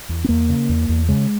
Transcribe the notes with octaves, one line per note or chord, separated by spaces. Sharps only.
E2
C4
E2 A#3
C#3
E2
E2
C#3 G#3